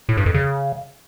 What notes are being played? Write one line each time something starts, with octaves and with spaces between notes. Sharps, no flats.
A2
G2
F2
C#3